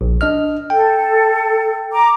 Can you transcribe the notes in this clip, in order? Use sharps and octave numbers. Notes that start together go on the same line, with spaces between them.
A#1
D4 D#5 F6
A4 G5
A#5 D6